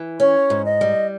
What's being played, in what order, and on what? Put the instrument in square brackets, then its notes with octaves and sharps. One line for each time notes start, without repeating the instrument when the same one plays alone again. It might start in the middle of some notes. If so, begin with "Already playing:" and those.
Already playing: [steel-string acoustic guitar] E3
[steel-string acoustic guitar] C#4 [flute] C#5
[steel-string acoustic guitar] G#2
[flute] D#5
[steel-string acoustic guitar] G3